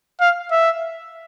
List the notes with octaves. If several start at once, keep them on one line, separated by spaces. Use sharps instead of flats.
F5
E5